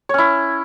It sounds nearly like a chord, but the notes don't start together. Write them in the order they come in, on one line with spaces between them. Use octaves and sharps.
C#5 C#4 E4